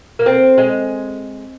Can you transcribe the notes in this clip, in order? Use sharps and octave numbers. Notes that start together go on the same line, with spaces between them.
A#3
C4
G#3